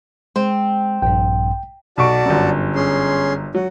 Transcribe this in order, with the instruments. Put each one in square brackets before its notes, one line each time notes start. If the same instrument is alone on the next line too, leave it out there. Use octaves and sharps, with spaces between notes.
[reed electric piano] G#3 [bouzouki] C4
[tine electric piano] A#1 G2 [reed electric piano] G5
[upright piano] B1 C#6 D7 [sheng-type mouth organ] F#4 D5 A5
[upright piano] G1 F#2
[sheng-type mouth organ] C#4 G#4 C6
[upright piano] F#3 [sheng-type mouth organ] F#4